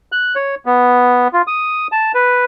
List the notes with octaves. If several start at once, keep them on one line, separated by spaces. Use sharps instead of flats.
F#6
C#5
B3
F4
D#6
A5
B4